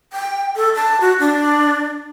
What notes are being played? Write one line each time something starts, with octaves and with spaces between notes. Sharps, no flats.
G5
A4
A5
F#4
D4